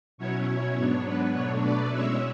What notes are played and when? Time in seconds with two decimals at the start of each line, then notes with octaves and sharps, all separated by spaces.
0.18 B2 F#3 C#4 E4 C#5
0.48 C#5
0.76 G#2 F#3 B3 D4 C#5
1.05 B4
1.34 B2 F#3 A3 D4 C#5
1.63 B4 D5
1.91 B2 G#3 C#4 E4 C#5 E5